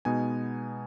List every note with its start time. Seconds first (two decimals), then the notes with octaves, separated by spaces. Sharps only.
0.05 B2 G#3 B3 D#4 G#5